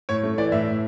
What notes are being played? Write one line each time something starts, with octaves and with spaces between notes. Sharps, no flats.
A2 C#5
A3
E3 D5
A2 E5
A2